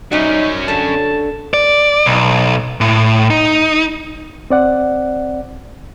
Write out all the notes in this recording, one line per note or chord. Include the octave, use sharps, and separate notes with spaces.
C3 F#3 G3 C#4 D#4
D3 A4 A5
D5
B1
A2
D#4
C4 D5 F#5